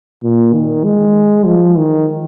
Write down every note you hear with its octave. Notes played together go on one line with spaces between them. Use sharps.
A#2
D#3
G#3
F3
D#3